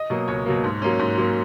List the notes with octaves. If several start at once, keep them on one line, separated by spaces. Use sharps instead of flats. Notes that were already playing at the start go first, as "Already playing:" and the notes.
Already playing: D#5
B2 F#3 A#3
C#2 C#5
B2 F#3 A#3
G#2
F#3 A#3 C#4
G#2
F#3 A#3 C#4